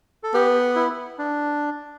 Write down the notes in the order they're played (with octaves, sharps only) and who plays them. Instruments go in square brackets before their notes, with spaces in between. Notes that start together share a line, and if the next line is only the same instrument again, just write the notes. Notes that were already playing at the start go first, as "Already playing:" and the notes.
[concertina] A4
[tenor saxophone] B3 [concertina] G4
[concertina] E4
D4